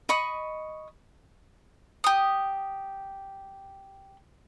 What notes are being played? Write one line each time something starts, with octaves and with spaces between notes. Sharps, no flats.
D#5 B5 C#6 D#6
G4 D#6